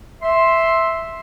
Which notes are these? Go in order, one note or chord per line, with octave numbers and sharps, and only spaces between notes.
E5 C6